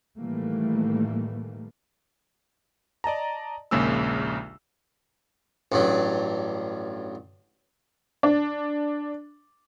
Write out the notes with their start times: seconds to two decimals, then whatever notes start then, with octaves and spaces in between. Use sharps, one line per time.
0.18 A2 D#3 E3 G3 A3 A#3
3.04 D5 D#5 A5 A#5
3.71 A#1 D#2 C#3 G#3 A#3 E6
5.72 A1 G2 F#3
8.23 D4